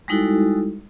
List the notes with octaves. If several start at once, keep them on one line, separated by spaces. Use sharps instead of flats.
G3 G#3 D#4 E4 F#4 A4